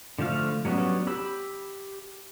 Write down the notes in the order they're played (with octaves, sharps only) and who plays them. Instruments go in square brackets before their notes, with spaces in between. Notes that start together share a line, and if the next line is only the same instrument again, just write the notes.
[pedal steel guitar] D3 F3 A3 F5 F6
F#3 G3 B3 C#4 D4
G4 B5 E6